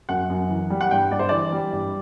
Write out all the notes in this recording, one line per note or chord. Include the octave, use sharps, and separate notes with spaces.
F#2 F#5
F#2
E3
G3
F#5
G2 G5
G2 D5
C5
E3 D5
G3
G2